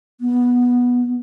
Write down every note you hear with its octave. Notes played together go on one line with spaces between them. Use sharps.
B3